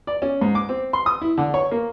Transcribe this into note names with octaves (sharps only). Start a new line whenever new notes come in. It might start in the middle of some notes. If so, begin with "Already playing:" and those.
D5
C#4
G#2
D6
C4
C6
D#6
E4
D3
C#5
A#3